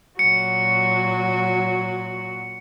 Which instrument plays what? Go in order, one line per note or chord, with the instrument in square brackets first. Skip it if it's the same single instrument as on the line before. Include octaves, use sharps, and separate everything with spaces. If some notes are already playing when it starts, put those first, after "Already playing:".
[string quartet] A#2 F#3 F#4 [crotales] C#7